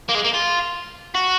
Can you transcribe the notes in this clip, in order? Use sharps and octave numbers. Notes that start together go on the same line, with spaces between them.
A#3
G#3
A#3
F4
F#4